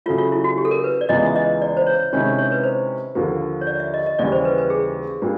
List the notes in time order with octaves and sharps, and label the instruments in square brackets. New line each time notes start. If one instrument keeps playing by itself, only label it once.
[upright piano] C#3 F#3 A3 [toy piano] F4
[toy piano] F4
E4
F#4
G4
A4
A#4
B4
D5
[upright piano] C#2 C#3 E3 G#3 B3 [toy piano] D#5
[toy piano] E5
D#5
D5
C5
C#5
[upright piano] C3 D#3 G#3 C#4 E4 [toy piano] C#5
[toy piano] C#5
B4
C5
[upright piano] D#2 D3 F3 A#3
[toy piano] C#5
D5
E5
D#5
D#5
[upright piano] D#2 C#3 E3 G3 [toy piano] D5
[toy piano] C5
B4
B4
G#4
[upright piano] A#2 G3 A#3 D4